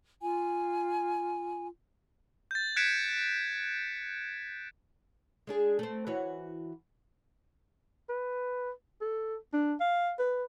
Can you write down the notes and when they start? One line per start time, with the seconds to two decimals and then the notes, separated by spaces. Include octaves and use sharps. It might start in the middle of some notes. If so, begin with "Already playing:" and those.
0.22 F4 G#5
2.51 G6 A6
2.76 F#6 G#6 B6 C#7 D7 E7
5.47 G#3 D4 G#4
5.79 A3 C4
6.07 E3 F#4 C#5
8.09 B4
9.01 A4
9.53 D4
9.80 F5
10.19 B4